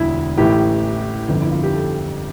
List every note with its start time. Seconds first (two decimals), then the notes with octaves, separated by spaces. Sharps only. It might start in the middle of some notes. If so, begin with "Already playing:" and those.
Already playing: E1 D2 D3 F3 E4
0.38 A1 A2 E3 G4
1.28 G1 F2 D3
1.41 E4
1.52 F4
1.63 G4
1.74 A4